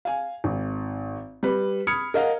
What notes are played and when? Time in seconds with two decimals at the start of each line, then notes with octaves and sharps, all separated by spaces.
0.05 F5 G#5
0.44 G#1
1.43 G3 B4
1.87 B5 D#6 F6 G#6 C#7
2.14 A#4 D#5 F5 F#5